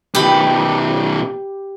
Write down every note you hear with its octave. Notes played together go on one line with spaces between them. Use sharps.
B2 D#3 G4 B5